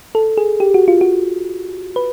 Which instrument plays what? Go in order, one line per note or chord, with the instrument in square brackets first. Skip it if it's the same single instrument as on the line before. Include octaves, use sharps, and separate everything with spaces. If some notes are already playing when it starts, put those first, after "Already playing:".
[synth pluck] A4
G#4
G4
F#4
F4
F#4
B4